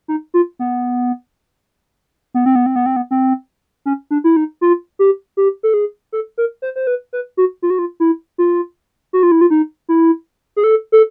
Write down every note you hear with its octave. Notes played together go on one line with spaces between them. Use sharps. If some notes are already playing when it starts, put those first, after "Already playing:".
D#4
F4
B3
B3
C4
B3
C4
B3
C4
B3
C4
C#4
D4
E4
D#4
F4
G4
G4
A4
G#4
A4
A#4
C5
C5
B4
B4
F#4
F4
F#4
F4
E4
F4
F#4
F4
E4
F4
D#4
E4
G#4
A4
A4